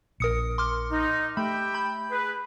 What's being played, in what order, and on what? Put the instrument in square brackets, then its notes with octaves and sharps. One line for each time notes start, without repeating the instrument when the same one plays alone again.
[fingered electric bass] A#1 [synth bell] A#4 D#6 C#7
[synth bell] C6 D6 F6
[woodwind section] D#4
[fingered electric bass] A3 [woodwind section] G4 E5 G5 [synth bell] B5
[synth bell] B5 G6
[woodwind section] G#4 B4